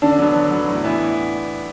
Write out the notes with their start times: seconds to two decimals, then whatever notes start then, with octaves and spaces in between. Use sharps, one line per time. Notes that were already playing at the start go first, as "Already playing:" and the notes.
0.02 D3 D4
0.19 F#3 B3
0.35 D3
0.51 F#3 B3
0.68 A2
0.84 E3 B3 E4